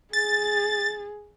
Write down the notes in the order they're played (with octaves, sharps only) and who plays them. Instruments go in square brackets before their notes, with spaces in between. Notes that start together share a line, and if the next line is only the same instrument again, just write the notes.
[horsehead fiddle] G#4 [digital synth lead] A6